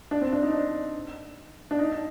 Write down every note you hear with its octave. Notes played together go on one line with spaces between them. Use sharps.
D4
C4
D4
D#4
D4
D4
D#4